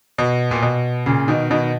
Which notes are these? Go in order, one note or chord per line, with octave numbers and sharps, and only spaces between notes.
B2
A#2
B2
A#2 C#3
B2 D#3
B2 D#3